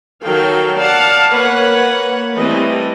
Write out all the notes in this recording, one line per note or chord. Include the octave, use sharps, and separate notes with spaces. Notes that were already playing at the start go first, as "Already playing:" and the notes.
D#3 F#3 A4 F5 G5
D5 F5 F#5 A5
A#3 B4 C#5 F#5
E3 G3 A3 C4 B4 D#5